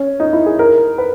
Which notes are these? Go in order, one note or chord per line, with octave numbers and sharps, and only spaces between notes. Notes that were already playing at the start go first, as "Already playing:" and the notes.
Already playing: C#4
D#4
E4
G#4
A#4
B4